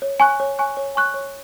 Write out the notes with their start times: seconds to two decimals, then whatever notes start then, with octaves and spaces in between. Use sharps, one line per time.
0.02 C#5
0.20 G#5 C#6 F#6
0.40 C#5
0.59 G#5 C#6 F#6
0.77 C#5
0.95 G#5 C#6 F#6
1.14 C#5